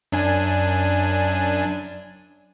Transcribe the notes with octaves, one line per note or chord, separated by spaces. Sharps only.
F#2 D4 G#5